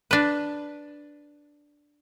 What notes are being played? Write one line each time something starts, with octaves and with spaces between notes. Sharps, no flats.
D4 B4